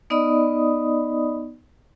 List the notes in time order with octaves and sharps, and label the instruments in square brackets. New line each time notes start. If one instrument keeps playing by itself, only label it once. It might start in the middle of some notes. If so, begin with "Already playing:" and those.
[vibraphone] B3 D#4 D5 D#5 B5 D#6